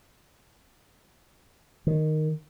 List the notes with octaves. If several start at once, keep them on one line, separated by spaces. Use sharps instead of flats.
D#3